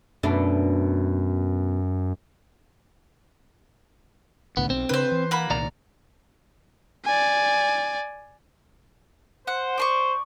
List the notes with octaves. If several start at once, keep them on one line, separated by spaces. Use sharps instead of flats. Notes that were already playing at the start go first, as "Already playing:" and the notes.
F#2 B2 A3 D4
C2 A2 D3 B3
B1 C4
C#3 D4 B4 C5
E3
A#3 F#4 B5
C2 A#2 D#3 D5 A#5
D5 G#5
C5 F#5
D5 C6 C#6